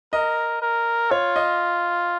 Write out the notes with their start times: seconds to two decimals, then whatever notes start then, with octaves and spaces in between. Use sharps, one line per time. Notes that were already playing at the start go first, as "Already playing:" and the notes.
0.13 A#4 D#5
0.62 A#4
1.11 F4 C#5
1.36 D#5